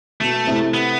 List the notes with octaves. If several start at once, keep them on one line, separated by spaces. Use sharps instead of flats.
B2 A3
A2 C3
B3